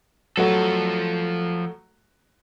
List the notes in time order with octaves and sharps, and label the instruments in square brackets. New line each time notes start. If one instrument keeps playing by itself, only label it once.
[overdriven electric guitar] F3 A4 [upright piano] F#3 A3 F#4